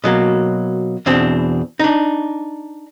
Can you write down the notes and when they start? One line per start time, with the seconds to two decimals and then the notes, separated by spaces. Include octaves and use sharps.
0.04 B2 F#3 A#3
1.06 E2 B2 C4 D4
1.79 D4 D#4